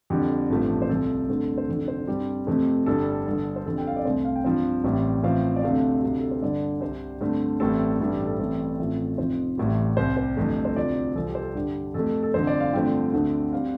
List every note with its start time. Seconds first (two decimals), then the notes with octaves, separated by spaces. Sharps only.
0.10 F2 D3 G3 G4
0.50 A1 G2 F3 A3 C4
0.82 C5
0.89 C2 C3 F3 C4 A4
1.29 G2 D3 A3 C4
1.58 C5
1.68 F1 F2 D3 A4
1.88 C5
2.07 G2 G3 C4 G4
2.47 F2 C3 A3 C4
2.86 G1 G2 G3 A4
3.26 G1 G2 D3
3.56 C5
3.66 G1 F2 D3 G3 A4
3.78 G5
3.87 F5
3.96 D5
4.05 C2 C3 A3 C4 C5
4.25 F5
4.36 G5
4.44 G2 F3 C4 F5
4.84 A1 A2 G3 C4
5.23 A1 A2 F3 C4 F5
5.56 D5
5.63 D2 C3 A3 C4 F5
6.02 D2 C3 G3
6.20 A4
6.31 C5
6.42 G1 G2 D3 D5
6.81 C2 C3 G3 C4 C5
7.21 G2 D3 A3 C4
7.60 A1 A2 G3 C4 A4
8.00 A1 G2 G3 A4
8.13 G4
8.27 A4
8.39 A1 A2 G3 C4
8.79 A1 A2 F3 A3 C4
9.18 F1 F2 F3 C4 C5
9.58 A1 A2 G3
9.97 C2 C3 G3 C5
10.17 C5
10.37 G1 F2 C3 A3
10.65 C5
10.76 D2 C3 F3 C4 D5
11.15 C2 C3 F3 A4
11.29 G4
11.35 C5
11.42 A4
11.55 G2 D3 G3 G4
11.94 F2 C3 A3 A4
12.23 A4
12.34 G1 F2 D3 C5
12.47 D5
12.60 F5
12.73 G2 D3 F3 A3 C4 G5
13.13 D2 D3 A3 C4
13.53 G3 C4 F5